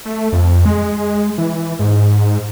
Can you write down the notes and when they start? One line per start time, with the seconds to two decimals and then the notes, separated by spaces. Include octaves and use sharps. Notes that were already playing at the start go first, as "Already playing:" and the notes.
0.05 A3
0.32 F2
0.66 G#3
1.38 E3
1.79 G#2